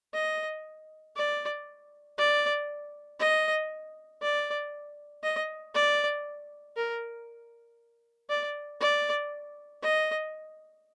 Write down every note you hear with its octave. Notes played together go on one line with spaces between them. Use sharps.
D#5
D5
D5
D#5
D5
D#5
D5
A#4
D5
D5
D#5